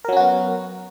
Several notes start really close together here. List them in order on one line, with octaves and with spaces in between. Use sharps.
A#4 F#3 C#4 F#4 B3